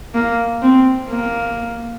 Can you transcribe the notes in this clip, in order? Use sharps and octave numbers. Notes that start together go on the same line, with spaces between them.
A#3
C4
A#3